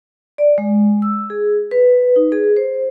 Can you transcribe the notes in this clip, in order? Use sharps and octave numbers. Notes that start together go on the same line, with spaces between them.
D5
G#3
E6
G#4
B4
D#4
G#4
C5